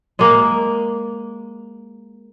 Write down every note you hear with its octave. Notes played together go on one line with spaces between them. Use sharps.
G#3 A#3